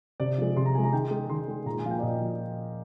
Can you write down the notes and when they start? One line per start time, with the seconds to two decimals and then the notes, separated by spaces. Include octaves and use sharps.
0.20 C3 D5
0.38 F3 G#3
0.56 C3 C6
0.66 A#5
0.74 F3 G#3 G#5
0.84 A#5
0.93 D#3 G5
1.11 G#3
1.29 D#3 C6
1.48 G#3
1.66 A#2 A#5
1.79 G#5
1.85 F3 A#3 F5
1.91 G5
1.99 D5
2.02 A#2 D#5
2.21 F3